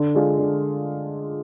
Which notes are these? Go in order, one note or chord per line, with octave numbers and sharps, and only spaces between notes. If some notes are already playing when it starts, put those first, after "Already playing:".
Already playing: D3
G#3 D4 F4 G#4
D3